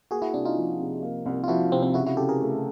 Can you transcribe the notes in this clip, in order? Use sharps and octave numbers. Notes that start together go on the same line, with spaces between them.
A#3 F#4 G#4
E4 F#4
C2 D4 E4
D#4 F4
F3
C3
A#3
C2
F4
F3 E4 F#4
C3 C4
C4
C#3 E4 F#4
E4 F#4
C#3 G4 A4
G#4 A#4
A3